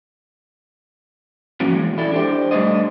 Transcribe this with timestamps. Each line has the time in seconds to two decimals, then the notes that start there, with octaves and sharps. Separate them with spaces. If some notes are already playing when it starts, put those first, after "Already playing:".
1.60 F3 A#3 B3 C#4 F#4
1.72 E3 G#3
1.98 E4 A4 D5
2.12 D4 G4 C5
2.51 G3 A3 D4 B4 C5 D#5